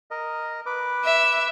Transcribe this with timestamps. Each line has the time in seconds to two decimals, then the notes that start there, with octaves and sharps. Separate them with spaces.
0.11 A#4 D#5
0.66 B4 D6
1.05 E5